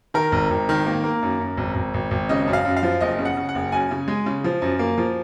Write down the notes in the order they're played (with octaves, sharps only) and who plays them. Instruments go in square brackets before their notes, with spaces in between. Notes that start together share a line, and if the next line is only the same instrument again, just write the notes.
[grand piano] D#3 A#4
G#1
G#1
D#3
A#3
A#3
F#2
F#2
G#1
G#1
G#1
G#1
C#3 D#5
F#2
F5
F#2
F5
F3
F#1 D#5
C#3
F#5
C#3
F#5
F#1
F#2 G#5
C#3
G#3
C#3
F3
F#2
A#3
F3